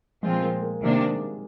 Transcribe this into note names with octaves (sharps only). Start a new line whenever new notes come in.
A#2 F3 G#3 C4 F4
A#3
A#3
C3 D#3 G3 A#3 D4
G#3